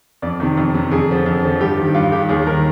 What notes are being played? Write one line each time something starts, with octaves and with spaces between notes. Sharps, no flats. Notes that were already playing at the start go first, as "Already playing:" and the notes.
F2 D5
C3 D#3
F2
C3 D#3
F2 G#4
D3 F3
F2
D3 F3
G2 G4
D#3
G2 F4
D#3 G4
D#2 G#4
D#3 A#4